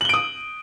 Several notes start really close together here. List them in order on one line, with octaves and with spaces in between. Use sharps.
F#7 G7 D7 D#6